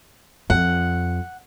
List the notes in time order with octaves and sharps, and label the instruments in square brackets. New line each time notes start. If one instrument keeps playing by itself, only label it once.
[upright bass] F2 [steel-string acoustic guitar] F#5